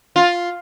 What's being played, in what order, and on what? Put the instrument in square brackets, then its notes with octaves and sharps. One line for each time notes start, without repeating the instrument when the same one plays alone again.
[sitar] F4